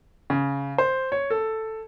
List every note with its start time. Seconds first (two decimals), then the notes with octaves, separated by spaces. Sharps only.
0.30 C#3
0.78 C5
1.12 C#5
1.30 A4